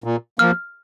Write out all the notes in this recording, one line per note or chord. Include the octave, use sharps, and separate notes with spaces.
A#2
F3 A#3 F6